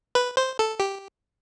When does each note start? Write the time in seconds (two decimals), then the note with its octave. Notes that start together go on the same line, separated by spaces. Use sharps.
0.15 B4
0.37 C5
0.59 A4
0.80 G4